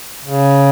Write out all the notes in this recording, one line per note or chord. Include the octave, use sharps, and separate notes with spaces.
C#3